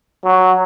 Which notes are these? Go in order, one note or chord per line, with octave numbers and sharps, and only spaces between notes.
F#3